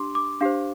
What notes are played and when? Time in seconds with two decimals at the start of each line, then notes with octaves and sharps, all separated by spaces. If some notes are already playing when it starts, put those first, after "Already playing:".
Already playing: D4 G4 C6 D6
0.15 D6
0.41 D4 G4 C5 F5